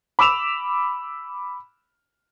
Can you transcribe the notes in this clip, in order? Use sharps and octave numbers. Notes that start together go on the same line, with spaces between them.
B5 D6 E6 E7 F7